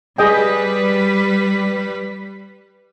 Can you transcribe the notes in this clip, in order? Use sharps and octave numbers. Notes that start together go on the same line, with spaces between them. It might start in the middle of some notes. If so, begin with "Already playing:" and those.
G3 G#4 B4 D#5 G5